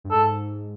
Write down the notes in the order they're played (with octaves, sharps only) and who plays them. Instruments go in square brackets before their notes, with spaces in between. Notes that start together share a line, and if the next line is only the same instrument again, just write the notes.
[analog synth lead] G2
[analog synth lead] G#2 [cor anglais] A4